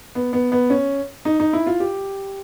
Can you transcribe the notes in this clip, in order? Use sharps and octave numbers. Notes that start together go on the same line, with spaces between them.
B3
B3
B3
C#4
D#4
D#4
E4
F4
G4